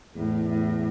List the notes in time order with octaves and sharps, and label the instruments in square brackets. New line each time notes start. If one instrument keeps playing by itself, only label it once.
[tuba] E2 [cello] A2
[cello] A2